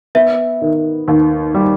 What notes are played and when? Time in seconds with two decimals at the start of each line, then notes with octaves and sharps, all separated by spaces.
0.15 B3 E5
0.62 D#3
1.08 D#2
1.55 G3